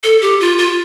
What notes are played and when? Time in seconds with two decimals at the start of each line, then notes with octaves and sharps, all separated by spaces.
0.04 A4
0.22 G4
0.40 F4
0.58 F4